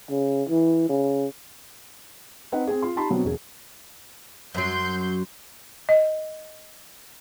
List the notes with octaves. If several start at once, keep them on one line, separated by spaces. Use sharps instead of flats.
C#3
E3
C#3
C4 D#4 B4 D#5 F#5
C4 G#4
F4 C6
D#4 G4 A5 B5 C6
B2 F#3 B3 C4 D4 F#4
E1 G#4
F#2 F#3 C6 G6
D#5